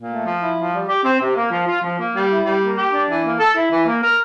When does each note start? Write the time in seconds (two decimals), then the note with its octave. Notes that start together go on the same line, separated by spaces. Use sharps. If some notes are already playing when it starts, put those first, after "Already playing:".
Already playing: A#2
0.09 A3
0.24 F3
0.40 E4
0.56 F3
0.72 G3
0.88 G4
1.04 C4
1.19 C3
1.35 A#3
1.50 F3
1.66 F4
1.82 F3
1.98 A#3
2.14 G3
2.30 E4
2.45 G3
2.61 A#3
2.77 G4
2.92 D4
3.08 E3
3.24 A#3
3.39 A4
3.56 E4
3.71 E3
3.86 A#3
4.02 A#4